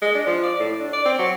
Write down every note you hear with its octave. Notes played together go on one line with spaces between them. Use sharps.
G#3
D4
F3
D5
A2
D4
D5
C4
F#3